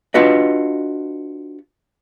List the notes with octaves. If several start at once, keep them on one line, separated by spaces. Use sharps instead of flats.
D4 F4 F#4 B4 D#5